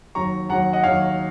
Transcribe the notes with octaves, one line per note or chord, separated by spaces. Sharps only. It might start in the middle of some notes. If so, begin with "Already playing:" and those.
D#2 D#3 F#3 A#5 C#6
D#2 D#3 F#3 F#5 A#5
D#5 F#5
D#2 D#3 F#3 C#5 F5